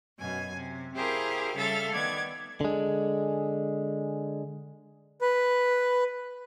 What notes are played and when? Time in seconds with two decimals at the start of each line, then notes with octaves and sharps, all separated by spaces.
0.18 F#2 B2 G#5
0.55 C3
0.95 E4 G4 G#4 A#4 C5 F5
1.55 C#3 G3 A4 E5 F5 A6
1.92 D#3 B3 D5 G#6
2.61 D3 G#3
5.21 B4